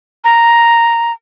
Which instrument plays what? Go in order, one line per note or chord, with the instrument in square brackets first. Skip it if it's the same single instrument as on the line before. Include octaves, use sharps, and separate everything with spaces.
[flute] A#5